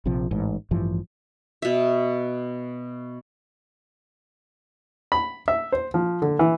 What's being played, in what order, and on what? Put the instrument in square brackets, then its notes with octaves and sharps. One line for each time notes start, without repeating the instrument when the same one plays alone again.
[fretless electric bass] A#1 C3 F3
A1 G#2
A1 G2 E3 F3
[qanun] B2 E5
[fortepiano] B5
E5
C5
F3
D3
E3